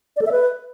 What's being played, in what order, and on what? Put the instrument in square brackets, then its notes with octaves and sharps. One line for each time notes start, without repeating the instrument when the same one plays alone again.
[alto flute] D5
A4
E5
B4